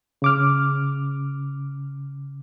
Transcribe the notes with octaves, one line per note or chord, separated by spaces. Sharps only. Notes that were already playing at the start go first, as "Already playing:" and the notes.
C#3 D6 F6